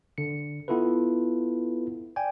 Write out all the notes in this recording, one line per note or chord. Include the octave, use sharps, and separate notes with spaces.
D3 C#7
B3 E4 F4 A4 B4
D5 G5 G#5